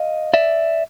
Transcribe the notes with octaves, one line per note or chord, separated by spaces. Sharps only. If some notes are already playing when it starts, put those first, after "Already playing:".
Already playing: D#5 F5
D5 E5